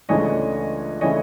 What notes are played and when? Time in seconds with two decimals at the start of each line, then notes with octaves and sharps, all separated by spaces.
0.09 C#2 C#3 E3 A3 D4 C#5 D#5
1.01 C#3 E3 A3 D4 C#5 D#5